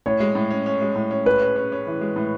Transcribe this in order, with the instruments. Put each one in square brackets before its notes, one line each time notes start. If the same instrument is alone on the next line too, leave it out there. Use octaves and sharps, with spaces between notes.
[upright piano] A2 [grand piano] C#5
[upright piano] G#3
A2
C#4
C#4
G#3
A2
C#4
[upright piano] A2 [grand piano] B4
[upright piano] C#4
C#4
C#4
E3
G#3
A2